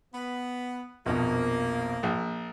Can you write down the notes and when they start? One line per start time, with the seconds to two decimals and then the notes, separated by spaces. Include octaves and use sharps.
0.14 B3
1.06 A#1 F2 B2 A#3
2.03 A#1